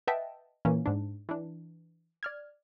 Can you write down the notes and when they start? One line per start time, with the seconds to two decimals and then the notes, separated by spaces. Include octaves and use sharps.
0.07 B4 D#5 E5 F#5 G5 A5
0.65 A#2 E3 A#3 C#4
0.86 G#2 D4
1.29 E3 D4
2.23 D5 F6 G#6